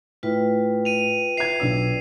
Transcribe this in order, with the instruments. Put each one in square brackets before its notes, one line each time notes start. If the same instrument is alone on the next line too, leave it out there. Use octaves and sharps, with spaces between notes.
[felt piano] A2 [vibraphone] F4 B4 G5
[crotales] D#7 F7
[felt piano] E5 G#6 [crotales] C7 F7
[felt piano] B1 D4 E6